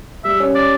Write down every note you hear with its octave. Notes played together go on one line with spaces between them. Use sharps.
G3 E5
C#4
D5